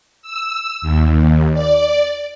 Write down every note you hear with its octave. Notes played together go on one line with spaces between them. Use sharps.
E6
D#2
D5